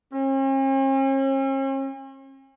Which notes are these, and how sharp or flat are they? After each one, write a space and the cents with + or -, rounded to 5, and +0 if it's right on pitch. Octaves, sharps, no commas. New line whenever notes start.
C#4 -45